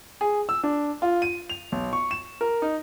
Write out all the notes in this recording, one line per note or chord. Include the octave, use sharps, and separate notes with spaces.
G#4
E6
D4
F4
D#7
F7
B1
C#6
E7
A#4
D#4